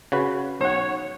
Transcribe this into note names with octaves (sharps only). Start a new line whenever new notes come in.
C#3 F#4 B4
B1 C#5 F#5